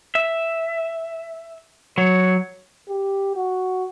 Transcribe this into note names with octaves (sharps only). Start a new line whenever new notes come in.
E5
F#3 C#5
G4
F#4